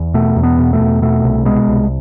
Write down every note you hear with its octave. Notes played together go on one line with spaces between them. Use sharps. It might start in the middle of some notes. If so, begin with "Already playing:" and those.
Already playing: E2
B2 A3
E2
B3
B2
A3
E2
B2 A3
C2
B2 G#3
C2